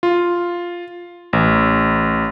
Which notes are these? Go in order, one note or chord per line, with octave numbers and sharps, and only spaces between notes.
F4
A1